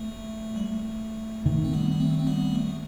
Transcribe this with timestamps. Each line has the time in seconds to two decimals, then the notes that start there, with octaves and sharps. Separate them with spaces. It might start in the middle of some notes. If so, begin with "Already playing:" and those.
Already playing: A3
0.56 G3
0.65 A3
1.46 D#3 A3
1.64 C4
1.73 G3 B3
1.91 B3
2.00 A3 C4
2.19 C4
2.27 G3 B3
2.55 A3